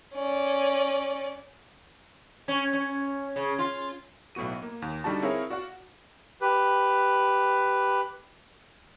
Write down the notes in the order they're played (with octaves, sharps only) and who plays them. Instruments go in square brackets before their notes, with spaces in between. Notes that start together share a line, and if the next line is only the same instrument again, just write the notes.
[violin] C#4 D5
[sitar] C#4
C#4
C#3
F4
[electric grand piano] B1 A2 B3 F#4 D#7
A#3
D#2
D3 G3 D#4 F#4 A5
C4 E4 G#4 A#4 C#5 F5
F#4 D5 F5 F#5
[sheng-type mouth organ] G4 B4